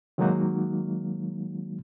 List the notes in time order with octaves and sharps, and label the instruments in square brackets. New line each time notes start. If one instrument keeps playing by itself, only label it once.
[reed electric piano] D#3 F#3 G#3 A#3 D#4 F#4